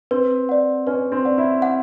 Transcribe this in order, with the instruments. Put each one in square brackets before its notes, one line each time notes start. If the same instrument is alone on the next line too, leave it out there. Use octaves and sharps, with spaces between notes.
[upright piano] C4 [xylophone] B4
[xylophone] D5 F#5
[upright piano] C#4 [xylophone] B4
[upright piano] C4
[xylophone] D5 F#5
[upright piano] E4
[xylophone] F#5